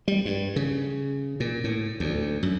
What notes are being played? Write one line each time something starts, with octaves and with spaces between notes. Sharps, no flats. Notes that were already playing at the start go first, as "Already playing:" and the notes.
G3
G2
C#3
A#2
A2
D2
F#2